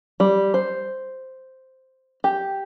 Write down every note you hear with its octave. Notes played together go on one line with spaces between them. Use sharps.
G3
C5
G4